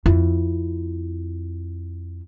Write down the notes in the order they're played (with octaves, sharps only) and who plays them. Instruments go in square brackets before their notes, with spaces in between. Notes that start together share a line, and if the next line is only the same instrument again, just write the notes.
[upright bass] F2 E4